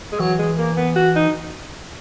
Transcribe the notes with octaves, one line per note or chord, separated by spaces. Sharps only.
G#3
E3 F#3
G#3
A#3
B3
F#4
D#4